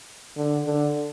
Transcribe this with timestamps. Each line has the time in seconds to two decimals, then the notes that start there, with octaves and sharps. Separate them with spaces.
0.37 D3
0.66 D3